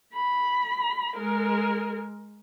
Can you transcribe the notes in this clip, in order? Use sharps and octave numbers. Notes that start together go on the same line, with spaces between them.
B5
G#3 A#4